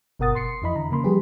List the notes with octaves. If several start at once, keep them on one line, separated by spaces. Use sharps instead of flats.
G1 B2 A#4 F#5 D#6 A6
C6 C7 C#7
F2 E3 E4 D#5 B5
D3 A#5
C#3 E3 A#3 B5 C6
F3 G3 G4 G#4 B4